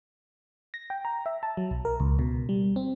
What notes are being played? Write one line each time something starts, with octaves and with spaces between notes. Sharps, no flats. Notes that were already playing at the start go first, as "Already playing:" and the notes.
A#6
G5
A#5
E5
A5
F#3
B1
A#4
C#2
B2
G3
C4